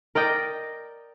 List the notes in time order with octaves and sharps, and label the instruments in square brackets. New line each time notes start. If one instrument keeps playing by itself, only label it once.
[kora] A#4 D5 D#5 G5